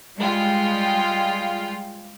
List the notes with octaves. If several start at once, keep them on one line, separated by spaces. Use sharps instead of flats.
G3 G#3 F4 G5